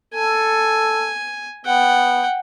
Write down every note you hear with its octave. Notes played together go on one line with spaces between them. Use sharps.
A4 G#5
B3 F#5 G5